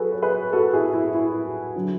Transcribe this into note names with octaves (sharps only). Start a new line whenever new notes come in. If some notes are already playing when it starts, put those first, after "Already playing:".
Already playing: F#3 F#4 G#4 A4 B4
C#5
G#4 B4
F#4 A4
E4 G#4
E4
E4
D3 F#3